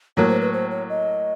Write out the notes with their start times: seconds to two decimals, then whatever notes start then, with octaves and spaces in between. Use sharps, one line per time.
0.17 A2 F#3 A#3 C#5
0.29 C5
0.41 B4
0.53 C5
0.71 C#5
0.89 D#5